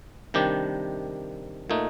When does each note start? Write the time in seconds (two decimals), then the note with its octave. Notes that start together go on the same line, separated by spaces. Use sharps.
0.34 C3 D#3 G3 D4 G4
1.70 A#2 A3 D#4